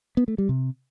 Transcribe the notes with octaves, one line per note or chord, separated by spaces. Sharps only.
B3
A3
G3
C3